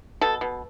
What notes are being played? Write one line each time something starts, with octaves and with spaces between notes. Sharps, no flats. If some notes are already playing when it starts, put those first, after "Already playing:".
B2 A4
B2